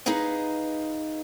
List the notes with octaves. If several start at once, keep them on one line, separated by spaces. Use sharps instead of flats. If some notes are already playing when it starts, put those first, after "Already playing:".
D#4 G#4 B4 D#5 F5